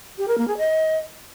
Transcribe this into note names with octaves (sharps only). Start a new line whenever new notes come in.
G4
A#4
A#3
G#4
D#5